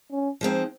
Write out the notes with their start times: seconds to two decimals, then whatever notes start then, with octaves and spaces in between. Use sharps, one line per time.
0.11 C#4
0.41 F3 G#3 C4 D#4